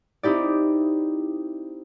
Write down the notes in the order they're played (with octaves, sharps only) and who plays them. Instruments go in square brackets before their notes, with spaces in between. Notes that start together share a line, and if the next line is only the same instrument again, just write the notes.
[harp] C4 D#4 E4 G4 D5